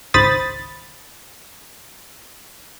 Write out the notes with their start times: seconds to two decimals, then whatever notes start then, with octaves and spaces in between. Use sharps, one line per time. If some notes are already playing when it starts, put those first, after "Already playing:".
0.14 G#1 C#2 C5 B5 D#6 A6